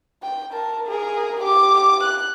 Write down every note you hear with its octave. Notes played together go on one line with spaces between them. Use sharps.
G5
A#4 A5
G#4 A#4
G4 D6
F#6